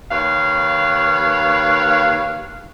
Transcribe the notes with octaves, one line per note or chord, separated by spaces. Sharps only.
D#2 B4 C#5 F5